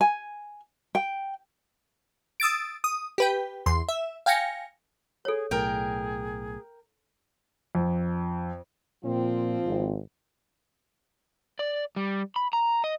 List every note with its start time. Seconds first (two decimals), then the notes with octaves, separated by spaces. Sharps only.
0.01 G#5
0.95 G5
2.40 D#6 E6 A6 D7
2.84 D#6
3.18 G4 B4 G5
3.66 E2 C6
3.89 E5
4.26 F5 G5 G#5 A#6 C#7
5.25 G#4 A4 C#5
5.51 B1 A2 G#4 A#4 G5
7.75 F2
9.04 A#2 F3 C4 F4
9.65 G#1
11.59 D5
11.96 G3
12.36 B5
12.53 A#5
12.84 D#5